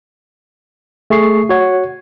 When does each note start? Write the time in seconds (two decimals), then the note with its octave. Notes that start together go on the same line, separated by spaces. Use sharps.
1.10 A3 G#4 C#6 C7
1.49 F#4 C#5 F#5